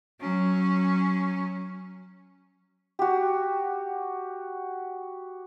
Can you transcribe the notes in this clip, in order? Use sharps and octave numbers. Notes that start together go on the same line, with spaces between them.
F#3 C#4
F#4 G4